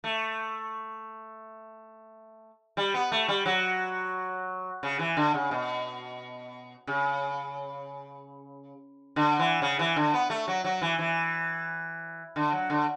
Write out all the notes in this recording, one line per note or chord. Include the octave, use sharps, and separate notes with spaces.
A3
G3
B3
A3
G3
F#3
C#3
E3
D3
C#3
B2
C#3
D3
E3
C#3
E3
D3
B3
A3
F#3
F#3
E3
E3
D3
F#3
D3